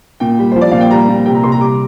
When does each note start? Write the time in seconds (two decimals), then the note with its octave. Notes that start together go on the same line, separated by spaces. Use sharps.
0.20 A#2 G5
0.39 G3
0.52 F3 C5
0.61 D5
0.71 A#2 F5
0.81 G5
0.91 G3 A#5
1.09 A#2
1.26 C3 G5
1.35 A#5
1.44 C3 C6
1.52 A#5
1.60 G3 D6